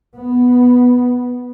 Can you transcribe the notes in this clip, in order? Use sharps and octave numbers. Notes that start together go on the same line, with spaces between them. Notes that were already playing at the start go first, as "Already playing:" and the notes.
B3